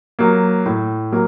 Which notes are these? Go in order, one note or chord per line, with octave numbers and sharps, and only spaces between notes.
F#3 A#3
A2
F#3 A#3